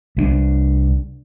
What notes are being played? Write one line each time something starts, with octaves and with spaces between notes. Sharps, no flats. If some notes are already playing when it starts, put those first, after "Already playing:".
C2 G#3 D4